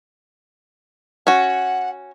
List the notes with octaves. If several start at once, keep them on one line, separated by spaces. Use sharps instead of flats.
C#4 F#4 F#5